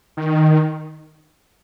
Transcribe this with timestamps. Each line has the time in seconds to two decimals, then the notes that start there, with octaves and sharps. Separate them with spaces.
0.17 D#3